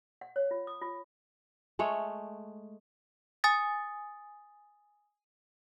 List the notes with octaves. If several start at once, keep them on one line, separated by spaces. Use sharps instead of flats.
F#5
C#5
F4
D#6
F4
G#3 A3 C#5
G#5 D#6 A6